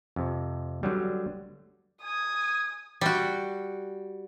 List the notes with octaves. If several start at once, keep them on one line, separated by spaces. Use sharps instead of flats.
F2 C3
D3 F#3 G3
G#5 D#6
G3 F#4